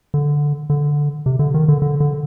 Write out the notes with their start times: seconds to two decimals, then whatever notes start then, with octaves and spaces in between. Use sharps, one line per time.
0.14 D3
0.70 D3
1.26 C3
1.39 D3
1.54 D#3
1.68 D3
1.82 D3
2.00 D3